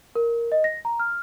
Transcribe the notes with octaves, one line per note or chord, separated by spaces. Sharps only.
A#4
D#5
A#6
A#5
F6